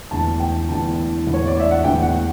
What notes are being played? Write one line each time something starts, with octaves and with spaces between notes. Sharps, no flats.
E1 E2 D3 A3 A5
G5
E1 E2 D3 A3 A5
E1 E2 D3 A3
C#5
D5
E5
F#5
E1 E2 D3 A3 G5
F#5